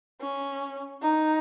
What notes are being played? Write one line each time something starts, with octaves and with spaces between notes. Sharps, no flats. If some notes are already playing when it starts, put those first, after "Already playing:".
C#4
D#4